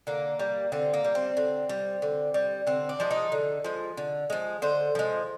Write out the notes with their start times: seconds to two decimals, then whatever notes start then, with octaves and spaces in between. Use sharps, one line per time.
0.07 D3 A#3
0.40 G3
0.72 D3 C4
0.94 A#3
1.05 G3
1.15 C4
1.37 D3
1.69 G3
2.02 D3
2.34 G3
2.67 D3 C4
2.89 D4
3.00 F3 G#3
3.11 D#4
3.32 D3
3.64 F3 G#3
3.97 D3
4.30 F3 G#3
4.62 D3 C5
4.95 F3 G#3